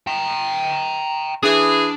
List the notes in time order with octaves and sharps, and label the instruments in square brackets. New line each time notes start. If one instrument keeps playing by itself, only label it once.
[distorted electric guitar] G5 A#5
[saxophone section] E3 G#4 [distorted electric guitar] D4